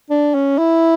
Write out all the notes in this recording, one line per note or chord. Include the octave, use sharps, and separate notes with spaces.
D4
C#4
E4